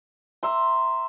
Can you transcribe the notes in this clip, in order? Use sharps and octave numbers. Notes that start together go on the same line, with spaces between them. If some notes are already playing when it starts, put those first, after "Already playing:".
E5 A#5 C6